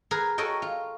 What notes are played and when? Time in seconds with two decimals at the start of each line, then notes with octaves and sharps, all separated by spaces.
0.11 G#4 A#4 B4
0.38 F#4 A4 A#4 C#5 D#5 G5
0.62 F4